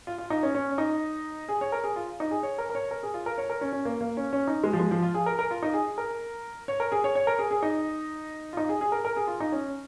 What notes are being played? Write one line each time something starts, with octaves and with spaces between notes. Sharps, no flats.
F4
F4
D#4
C#4
C#4
D#4
G#4
C#5
A#4
G#4
F4
D#4
G#4
C#5
A#4
A#4
C#5
A#4
G#4
F4
A#4
C#5
A#4
C#4
C#4
A#3
A#3
C#4
C#4
D#4
G#3
F3
G#3
F3
F4
G#4
A#4
A#4
F4
D#4
G#4
A#4
C#5
A#4
G#4
C#5
C#5
A#4
G#4
G#4
D#4
F4
D#4
G#4
G#4
A#4
A#4
G#4
F4
D#4
C#4